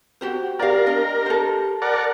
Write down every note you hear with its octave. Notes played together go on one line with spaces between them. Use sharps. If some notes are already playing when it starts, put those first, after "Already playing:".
F#4 G4 C5
G4 A#4 D5 F5 A#5
D4 D#5
A4 C5
A#4 D5 F#5